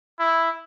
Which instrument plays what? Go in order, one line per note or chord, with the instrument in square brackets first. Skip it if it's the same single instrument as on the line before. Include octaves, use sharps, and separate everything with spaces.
[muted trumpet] E4